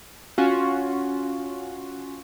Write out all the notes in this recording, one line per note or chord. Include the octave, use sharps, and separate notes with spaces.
C#4 F4 F#4